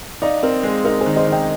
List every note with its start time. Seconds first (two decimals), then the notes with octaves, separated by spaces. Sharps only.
0.22 D#4 D5 F5
0.43 C4 A#4
0.63 G#3 G#4
0.85 D#4 A#4
1.00 G#4 C5
1.06 D#3
1.16 C5 D#5
1.27 D#3
1.32 D#5 G5